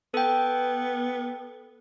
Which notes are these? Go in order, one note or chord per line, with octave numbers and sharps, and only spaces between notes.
B3 A4 G5